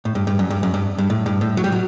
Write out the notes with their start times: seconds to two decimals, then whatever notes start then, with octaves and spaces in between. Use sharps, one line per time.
0.05 A2
0.15 G2
0.27 G2
0.39 F#2
0.50 G2
0.63 F#2
0.74 G2
0.98 G2
1.10 A2
1.26 G2
1.41 A2
1.57 F#3
1.64 G3
1.72 F#3